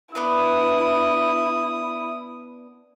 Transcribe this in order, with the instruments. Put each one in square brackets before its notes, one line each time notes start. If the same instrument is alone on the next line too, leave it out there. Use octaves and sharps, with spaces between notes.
[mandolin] B3 D4 B4 [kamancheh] E4 [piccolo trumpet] D#6